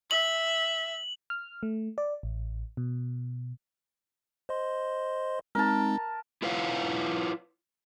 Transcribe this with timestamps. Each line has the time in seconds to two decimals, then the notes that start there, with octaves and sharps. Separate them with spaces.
0.11 E5 F#7
1.30 F6
1.63 A3
1.98 D5
2.23 A1
2.77 B2
4.49 C5 D#5 C6
5.55 G#3 C4 D#4 A#4 A5
6.42 E4 F4 B4 C#5 F5 F#5